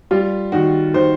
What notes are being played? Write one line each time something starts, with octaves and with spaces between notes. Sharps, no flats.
G3 F4
D#3 F#4
D#3 C5